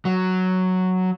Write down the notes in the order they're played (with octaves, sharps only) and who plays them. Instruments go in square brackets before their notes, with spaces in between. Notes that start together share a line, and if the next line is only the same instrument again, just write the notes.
[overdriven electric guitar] F#3